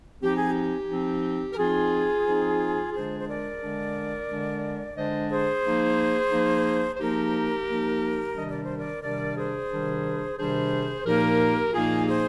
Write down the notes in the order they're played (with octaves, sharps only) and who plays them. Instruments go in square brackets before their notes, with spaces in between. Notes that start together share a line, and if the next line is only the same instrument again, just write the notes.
[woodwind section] F3 C4 D#4 G4
G#4
G4
F3 C4 D#4
A#4
F3 C4 D#4 F4 G#4
F3 C4 D#4
D3 G#3 D4 G#4 C5
C5
A#4 D5
D3 G#3 D4
D3 G#3 D4
D3 G#3 D4 C5 D#5
G#4 C5
F3 A#3 D#4
F3 A#3 D#4
C5
F3 A#3 D#4 G4 A#4
F3 A#3 D#4
C3 D#3 G3 D4 D#5
D5
C5
A#4 D5
C3 D#3 G3 D4 A#4 D5
G#4 C5
C3 D#3 G3 D4
C3 D#3 G3 D4 G#4 C5
A#2 F3 A#3 D#4 G4 A#4
A#2 F3 A#3 D#4 F4 G#4
G#4 C5